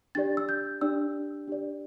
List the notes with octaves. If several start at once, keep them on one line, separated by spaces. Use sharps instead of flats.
D4 G4 D5 A6
E6
G6
D4 G4 D5 E6
D4 G4 D5